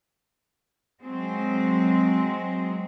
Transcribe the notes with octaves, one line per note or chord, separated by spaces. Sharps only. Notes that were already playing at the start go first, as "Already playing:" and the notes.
F#3 G#3 C4